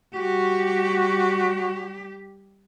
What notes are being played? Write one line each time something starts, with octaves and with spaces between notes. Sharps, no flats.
G3 F#4 G4